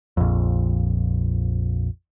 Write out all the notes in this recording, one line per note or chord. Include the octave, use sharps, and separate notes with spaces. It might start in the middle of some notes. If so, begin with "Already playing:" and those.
A#1 F2